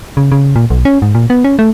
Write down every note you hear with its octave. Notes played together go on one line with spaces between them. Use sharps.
C#3
C#3
A#2
B1
C#4
G#2
A#2
B3
C#4
A3